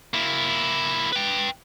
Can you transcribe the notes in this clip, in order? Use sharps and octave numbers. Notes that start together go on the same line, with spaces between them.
A#3 E4
B4 G5